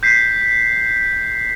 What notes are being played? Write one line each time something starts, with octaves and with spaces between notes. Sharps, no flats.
G6 B6 C7